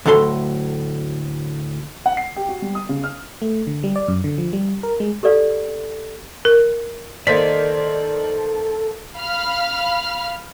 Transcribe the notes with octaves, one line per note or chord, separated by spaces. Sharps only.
D2 A2 F#3 A4 A#5 C6
F#5
C7
G4
F#4
G3
D#6
C#3
F6
A3
D3
G3
D5
F#2
D3
F3
G3
A#4
G#3
G4 A4 D5 F5
A#4
D#3 A#3 A4 C5 D5 B6
F5 B5 F6